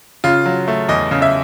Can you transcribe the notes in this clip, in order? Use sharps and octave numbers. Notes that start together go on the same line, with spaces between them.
C#3 F4
F#3
A3
E2 D#5
C#3
E5